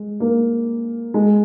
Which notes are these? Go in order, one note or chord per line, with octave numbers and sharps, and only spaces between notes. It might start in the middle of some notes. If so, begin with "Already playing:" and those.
Already playing: G#3
A#3
G#3